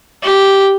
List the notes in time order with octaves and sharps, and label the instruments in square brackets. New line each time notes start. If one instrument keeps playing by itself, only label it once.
[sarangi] G4